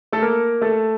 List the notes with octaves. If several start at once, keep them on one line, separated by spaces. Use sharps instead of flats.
A3 A4
A#3 A#4
A3 A4